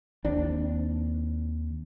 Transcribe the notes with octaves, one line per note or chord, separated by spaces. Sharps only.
D#2 C4 D4